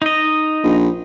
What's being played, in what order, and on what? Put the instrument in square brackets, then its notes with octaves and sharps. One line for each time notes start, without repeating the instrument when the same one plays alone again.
[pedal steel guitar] D#4 D#5
[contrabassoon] A#1